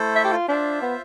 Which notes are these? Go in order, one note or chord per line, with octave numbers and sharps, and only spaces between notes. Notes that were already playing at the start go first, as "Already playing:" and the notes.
Already playing: A3 E4 A4 C5
E5
G4
F4
D4 F4 C5 E5
B3